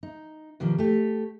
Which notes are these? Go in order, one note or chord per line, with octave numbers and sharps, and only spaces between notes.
D#4
B2 D#3 F3 G3
A3 G4